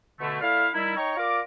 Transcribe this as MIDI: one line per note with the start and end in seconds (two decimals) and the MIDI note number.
0.19 0.39 47
0.19 0.39 50
0.19 0.39 57
0.41 0.68 57
0.41 0.68 64
0.41 0.68 74
0.41 0.68 77
0.74 0.96 51
0.74 0.96 55
0.74 0.96 63
0.74 0.96 64
0.97 1.16 63
0.97 1.16 73
0.97 1.16 79
0.97 1.16 82
0.97 1.16 85
1.17 1.40 65
1.17 1.40 70
1.17 1.40 74
1.17 1.40 86